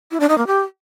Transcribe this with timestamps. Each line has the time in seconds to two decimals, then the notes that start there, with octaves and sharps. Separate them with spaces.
0.11 E4
0.20 D4
0.29 D#4
0.38 A#3
0.47 G4